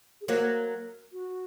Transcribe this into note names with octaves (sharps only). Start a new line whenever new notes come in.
G#4
F#3 A#3 A#4
F#4